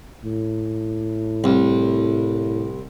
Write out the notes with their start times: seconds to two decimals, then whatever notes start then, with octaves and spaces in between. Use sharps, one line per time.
0.25 A2
1.44 C2